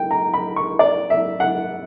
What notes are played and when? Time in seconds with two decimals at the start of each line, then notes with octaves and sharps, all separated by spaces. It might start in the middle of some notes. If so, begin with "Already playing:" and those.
Already playing: G5
0.11 A#5
0.34 B5
0.56 C#6
0.79 D5
1.10 E5
1.40 F#5